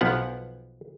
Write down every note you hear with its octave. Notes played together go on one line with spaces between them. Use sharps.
B1 F3 B3 F#5